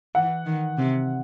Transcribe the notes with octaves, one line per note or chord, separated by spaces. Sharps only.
E3 F#5
D#3
C3